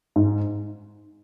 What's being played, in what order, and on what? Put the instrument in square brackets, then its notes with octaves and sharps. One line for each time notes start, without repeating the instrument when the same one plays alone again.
[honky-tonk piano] G#2